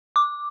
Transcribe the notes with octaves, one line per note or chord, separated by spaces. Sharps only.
D6